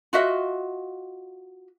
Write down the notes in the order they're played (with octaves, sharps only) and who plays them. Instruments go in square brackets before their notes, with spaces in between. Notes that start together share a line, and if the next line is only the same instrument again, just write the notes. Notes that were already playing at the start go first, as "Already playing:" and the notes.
[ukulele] F4 F#4 D#5 E5